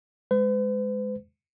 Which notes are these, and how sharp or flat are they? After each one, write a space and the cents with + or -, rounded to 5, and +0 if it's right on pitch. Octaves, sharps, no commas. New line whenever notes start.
G#3 +0 B4 +45